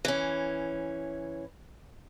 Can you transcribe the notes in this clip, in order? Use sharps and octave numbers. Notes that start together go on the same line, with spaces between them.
E3 C#4